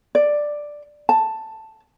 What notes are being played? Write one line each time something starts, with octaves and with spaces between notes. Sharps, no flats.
D5
A5